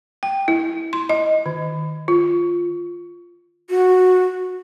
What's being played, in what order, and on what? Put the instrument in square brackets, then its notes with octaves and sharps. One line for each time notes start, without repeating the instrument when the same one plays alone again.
[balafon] G5
E4
C6
D#5
D#3
F4
[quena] F#4